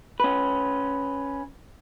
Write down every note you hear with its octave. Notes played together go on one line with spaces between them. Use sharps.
C#4 B4